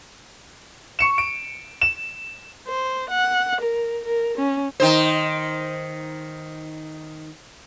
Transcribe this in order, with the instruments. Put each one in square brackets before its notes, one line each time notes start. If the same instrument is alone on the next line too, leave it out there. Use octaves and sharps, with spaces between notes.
[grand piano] C#6 C#7 E7
D7
E7
[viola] C5
F#5
A#4
A#4
C#4
[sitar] D#3 D#4 C5